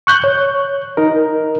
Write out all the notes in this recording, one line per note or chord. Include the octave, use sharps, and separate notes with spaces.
C#6 F#6 G6
C#5
D#4 A#4